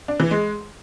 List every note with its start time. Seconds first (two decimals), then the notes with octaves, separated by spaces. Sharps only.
0.08 D4
0.20 E3
0.31 G#3